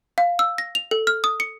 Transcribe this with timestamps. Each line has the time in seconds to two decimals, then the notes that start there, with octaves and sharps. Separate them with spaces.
0.18 F5
0.39 E6
0.58 A#6
0.75 F7
0.91 A4
1.07 F6
1.24 D#6
1.40 C#7